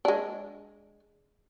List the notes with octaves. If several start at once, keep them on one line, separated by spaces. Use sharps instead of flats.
G#3 D4